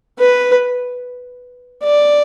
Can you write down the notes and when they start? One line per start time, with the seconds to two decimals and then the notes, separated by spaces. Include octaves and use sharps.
0.19 B4
1.83 D5